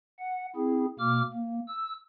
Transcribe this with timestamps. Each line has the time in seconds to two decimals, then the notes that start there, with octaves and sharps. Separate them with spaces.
0.19 F#5
0.56 C4 E4 G#4
0.99 B2 A#3 D6 F6
1.33 A#3
1.68 E6